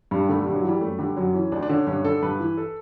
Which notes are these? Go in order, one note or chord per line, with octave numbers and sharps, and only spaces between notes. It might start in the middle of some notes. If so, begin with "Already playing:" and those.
G2 G3
D3 A3
G2 G3
F#3
E3 G3
F#2 A3
D3 G3
F#2 F#3
E3 C#4
D2 D4
D4
D3 C#4
G2 C#4
D3 A4
G2 B4
E3
A4